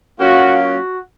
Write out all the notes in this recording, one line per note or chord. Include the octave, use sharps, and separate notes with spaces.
F#3 A#3 C#4 F4 F#4
F#4